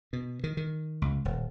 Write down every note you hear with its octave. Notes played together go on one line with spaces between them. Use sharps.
B2
D#3
D#3
C#2
D#1